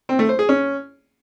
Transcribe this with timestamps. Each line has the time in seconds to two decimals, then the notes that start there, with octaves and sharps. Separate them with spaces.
0.09 C4
0.19 A3
0.29 C5
0.39 G#4
0.49 C#4